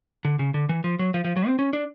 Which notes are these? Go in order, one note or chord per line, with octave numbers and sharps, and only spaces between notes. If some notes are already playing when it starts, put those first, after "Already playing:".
D3
C#3
D3
E3
F3
F#3
F3
F3
F#3
C4
C#4
D4